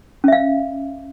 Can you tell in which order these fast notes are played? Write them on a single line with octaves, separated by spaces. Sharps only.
C#4 E5 F5